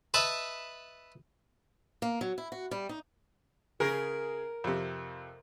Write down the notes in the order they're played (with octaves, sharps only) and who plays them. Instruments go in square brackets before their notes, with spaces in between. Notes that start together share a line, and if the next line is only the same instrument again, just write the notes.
[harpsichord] B4 D#5 E5 A5 B5
[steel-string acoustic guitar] A#3
F#3
E4
F#4
G3
D#4
[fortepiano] C#3 G#4 [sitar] A#4
[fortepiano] F2 C3